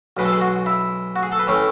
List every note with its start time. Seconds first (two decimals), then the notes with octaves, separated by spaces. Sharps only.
0.17 B1 B2 G#3 B4
0.25 A4
0.33 G#4
0.41 F#4
0.66 E4
1.16 F#4
1.23 G#4
1.32 A4
1.39 B4
1.47 A2 E3 A3 C#4